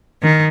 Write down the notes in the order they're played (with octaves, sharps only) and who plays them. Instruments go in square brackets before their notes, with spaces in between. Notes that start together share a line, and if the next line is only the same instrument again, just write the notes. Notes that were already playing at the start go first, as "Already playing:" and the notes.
[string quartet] D#3